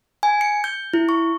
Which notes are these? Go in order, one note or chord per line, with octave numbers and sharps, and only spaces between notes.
G#5
C#7
G6
E4
C#6